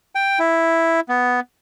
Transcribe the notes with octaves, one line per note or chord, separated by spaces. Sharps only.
G5
E4
B3